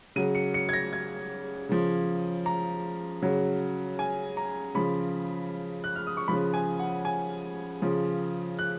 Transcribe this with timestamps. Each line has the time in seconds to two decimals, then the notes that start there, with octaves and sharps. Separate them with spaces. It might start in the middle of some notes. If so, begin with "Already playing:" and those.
0.16 C#3 F#3 D#7
0.35 C#7
0.54 C#7
0.69 G#6
0.73 A#6
0.93 G#6
1.69 C#3 F3
2.46 A#5
3.22 C#3 F#3
3.99 G#5
4.37 A#5
4.75 C#3 F3 B5
5.84 F#6
5.96 F6
6.07 D#6
6.17 C#6
6.28 C#3 F3 B5
6.54 G#5
6.79 F#5
7.05 G#5
7.82 C#3 F3
8.59 F#6